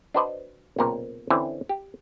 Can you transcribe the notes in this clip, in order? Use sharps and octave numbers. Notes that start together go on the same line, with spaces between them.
D4 F#4 B4 C5 D5 D#5
B1 A#2 C#3 C4 A#4
D3 E3 C4 C#4 E4
G4